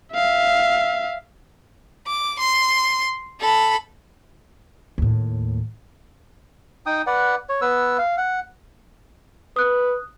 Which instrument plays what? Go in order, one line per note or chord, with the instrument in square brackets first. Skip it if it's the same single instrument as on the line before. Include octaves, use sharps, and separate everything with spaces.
[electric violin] E5 F5
[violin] D6
C6
A4 B5
[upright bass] D#2 A2
[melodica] D#4 G5 D#6
B4 D5 F#5
C#5
B3 B4 E6
F5
F#5
[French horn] B4 [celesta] D#6 F#6